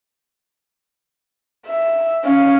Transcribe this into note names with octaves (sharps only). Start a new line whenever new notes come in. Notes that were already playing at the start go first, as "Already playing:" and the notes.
E5
C#4 F5